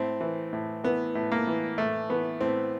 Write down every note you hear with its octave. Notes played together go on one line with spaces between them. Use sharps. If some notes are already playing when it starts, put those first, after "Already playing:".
Already playing: A2 C4
E3
A2
E3 B3
A2
A#3
E3
A2 A3
E3 B3
A2 C4